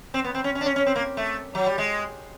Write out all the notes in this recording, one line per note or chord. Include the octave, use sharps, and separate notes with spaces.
C4
B3
C4
C#4
C#4
D4
C#4
C#4
C4
A#3
A3
F#3
G3
G#3